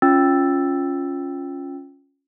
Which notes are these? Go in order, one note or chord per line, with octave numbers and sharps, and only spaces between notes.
C#4 F4 G5 E6 A6